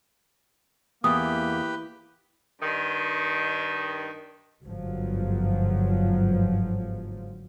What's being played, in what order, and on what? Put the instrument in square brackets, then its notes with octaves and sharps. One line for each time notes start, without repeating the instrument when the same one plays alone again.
[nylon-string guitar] E2 [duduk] A#3 [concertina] G4 B4 [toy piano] D#6
[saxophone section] G2 D#3
[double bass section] G1 G#2 F3 F#3